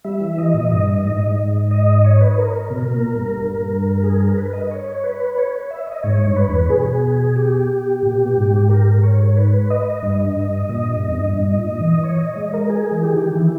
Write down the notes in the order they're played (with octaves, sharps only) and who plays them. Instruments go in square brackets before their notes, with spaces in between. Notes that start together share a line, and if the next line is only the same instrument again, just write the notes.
[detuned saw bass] G3 [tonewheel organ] E5
[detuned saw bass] E3
[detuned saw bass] E3 [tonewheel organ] D#5
[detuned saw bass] A#2
[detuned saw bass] G2 [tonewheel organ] D#5
[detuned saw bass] G#2 [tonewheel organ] D#5
[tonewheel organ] D#5
C#5
B4
A#4
A#4
[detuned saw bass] B2
B2
A#2
G2
G2
[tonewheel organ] G#4
A#4
B4
D#5
C#5
B4
C#5
E5
D#5
[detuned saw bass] G#2 [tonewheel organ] C#5
[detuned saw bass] G2
[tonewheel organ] B4
[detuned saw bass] E2
[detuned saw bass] B2 [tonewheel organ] G#4
[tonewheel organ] G4
[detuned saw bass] A#2
B2
A#2
G#2
[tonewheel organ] A#4
C#5
B4
D#5
[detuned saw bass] G2
G2
[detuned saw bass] A#2 [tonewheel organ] D#5
[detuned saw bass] G2
E2
G2
G2
G#2
A#2
E3
[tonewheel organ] C#5
D#5
[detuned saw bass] G#3 [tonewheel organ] D#5
[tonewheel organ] A#4
G#4
[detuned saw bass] E3
[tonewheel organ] G4
[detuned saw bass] D#3
[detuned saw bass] E3 [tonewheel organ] E4